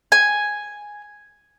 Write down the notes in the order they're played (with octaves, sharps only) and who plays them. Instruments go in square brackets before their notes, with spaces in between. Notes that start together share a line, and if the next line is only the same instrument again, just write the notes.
[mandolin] G#5